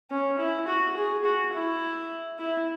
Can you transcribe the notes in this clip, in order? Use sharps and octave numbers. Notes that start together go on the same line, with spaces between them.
C#4
E4
F#4
G#4
F#4
E4
E4